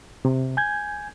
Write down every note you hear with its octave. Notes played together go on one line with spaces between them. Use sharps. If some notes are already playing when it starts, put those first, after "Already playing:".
C3
G#5 G6 G#6